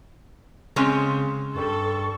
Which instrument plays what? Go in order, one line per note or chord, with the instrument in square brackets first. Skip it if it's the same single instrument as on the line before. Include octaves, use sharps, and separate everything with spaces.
[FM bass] C#3 [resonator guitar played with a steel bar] G#3 C4 C#4
[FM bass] G2 [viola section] A4 [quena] C#6